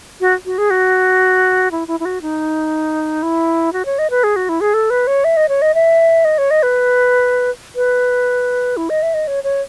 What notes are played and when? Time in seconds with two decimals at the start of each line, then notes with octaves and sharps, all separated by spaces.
0.21 F#4
0.46 F#4
0.58 G#4
0.70 F#4
1.71 E4
1.88 E4
2.00 E4
2.05 F#4
2.22 D#4
3.23 E4
3.73 F#4
3.86 C#5
3.99 D#5
4.10 B4
4.24 G#4
4.36 F#4
4.49 E4
4.61 G#4
4.74 A4
4.90 B4
5.07 C#5
5.24 E5
5.37 D#5
5.49 C#5
5.62 D#5
5.74 E5
6.25 D#5
6.38 C#5
6.51 D#5
6.63 B4
7.76 B4
8.77 E4
8.90 D#5
9.03 E5
9.14 D#5
9.27 C#5
9.44 C#5